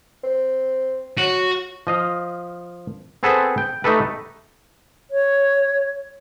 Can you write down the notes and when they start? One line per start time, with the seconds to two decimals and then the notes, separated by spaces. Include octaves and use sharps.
0.23 C4
1.18 F#3 F#4
1.87 F3 D#5 F5
3.23 B3 C4 G#4 A4 B4 C5
3.58 G5
3.84 A3 D#4 G4 A4 B4
5.11 C#5